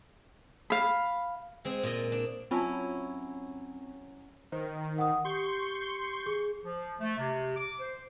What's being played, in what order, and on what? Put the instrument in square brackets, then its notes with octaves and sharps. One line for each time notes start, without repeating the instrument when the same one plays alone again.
[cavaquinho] F5 B5
[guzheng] G#3 C4 G#4 G#5
A#2 D#5
D4
[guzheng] F#3 C#4 E4 [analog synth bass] C4 [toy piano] F4 A5
[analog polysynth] D#3 [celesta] C5
[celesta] F#5 D#6
[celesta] G4 [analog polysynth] C6 C#6 G6
[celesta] G#4
[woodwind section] F3
A3
C3
D6
C5